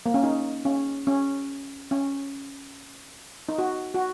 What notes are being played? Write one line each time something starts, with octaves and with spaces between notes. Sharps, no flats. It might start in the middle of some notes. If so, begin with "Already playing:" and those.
A#3
C#4
D#4
C#4
C#4
C#4
D#4
F#4
F#4